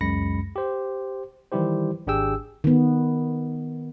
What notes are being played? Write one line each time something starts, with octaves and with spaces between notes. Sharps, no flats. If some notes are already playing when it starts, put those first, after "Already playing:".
C#2 F#2 G#3 B5 A#6 C#7
G4 C5
D#3 E3 G3 E4 G4 C5
G#1 D4 G4 G#4 G5 E6
D#3 B3